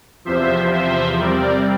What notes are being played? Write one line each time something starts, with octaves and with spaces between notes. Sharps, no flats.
E2 C3 F3 C5 E5
C5 E5
C3 G3 C4 A#4 D5